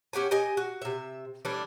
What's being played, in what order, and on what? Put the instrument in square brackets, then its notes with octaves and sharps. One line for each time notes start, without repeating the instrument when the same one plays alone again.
[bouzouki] C#4 G4 F#5 G#5
G4 D#5 G#5
F#4
C3 E5
E3 G3 A3 D4